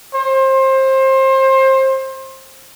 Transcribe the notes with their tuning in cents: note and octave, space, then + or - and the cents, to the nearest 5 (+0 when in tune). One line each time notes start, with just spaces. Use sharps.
C5 +25